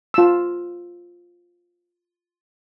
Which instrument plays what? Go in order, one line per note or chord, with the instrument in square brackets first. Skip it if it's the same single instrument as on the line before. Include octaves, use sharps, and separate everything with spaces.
[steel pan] F4 E6